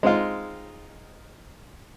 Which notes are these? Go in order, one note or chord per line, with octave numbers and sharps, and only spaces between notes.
G#3 C4 D#4 F4